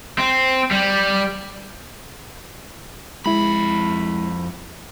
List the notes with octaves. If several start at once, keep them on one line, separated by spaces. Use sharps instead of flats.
C4
G3
F2 G#3 E4 B5